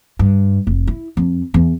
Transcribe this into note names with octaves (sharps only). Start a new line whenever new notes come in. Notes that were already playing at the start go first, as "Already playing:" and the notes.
G2
F1
E4
F2
E2